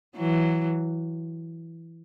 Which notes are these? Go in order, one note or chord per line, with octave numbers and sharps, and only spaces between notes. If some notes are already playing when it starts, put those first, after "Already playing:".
E3 F#3